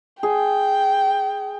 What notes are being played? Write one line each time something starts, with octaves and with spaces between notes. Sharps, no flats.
G#4 G5